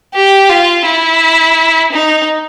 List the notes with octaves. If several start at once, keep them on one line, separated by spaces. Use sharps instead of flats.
G4
F4
E4
D#4